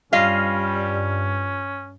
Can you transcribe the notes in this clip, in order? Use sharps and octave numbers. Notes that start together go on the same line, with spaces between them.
G2 G3 C#4 F4 D#5 F5